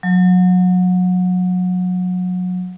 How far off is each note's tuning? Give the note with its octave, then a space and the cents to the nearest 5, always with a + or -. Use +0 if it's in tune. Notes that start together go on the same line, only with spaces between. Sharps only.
F#3 -30